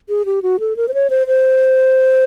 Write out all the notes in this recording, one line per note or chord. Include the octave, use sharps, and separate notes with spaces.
G#4
G4
F#4
A4
A#4
C5
C#5
C5
C5